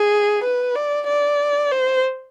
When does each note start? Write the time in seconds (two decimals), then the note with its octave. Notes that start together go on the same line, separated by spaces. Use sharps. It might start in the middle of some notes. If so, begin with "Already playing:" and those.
Already playing: G#4
0.43 B4
0.75 D5
1.07 D5
1.71 C5